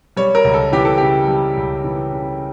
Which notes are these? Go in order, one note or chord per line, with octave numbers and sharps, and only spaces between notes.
G3 C#5
A#4
C#2
A4
E3 G4
A4
C#3 G4
G3
C#2
E3
C#3